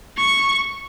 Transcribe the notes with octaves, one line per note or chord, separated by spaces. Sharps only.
C#6